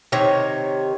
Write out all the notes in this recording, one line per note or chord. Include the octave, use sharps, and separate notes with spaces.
C3 D#3 C#5 A#5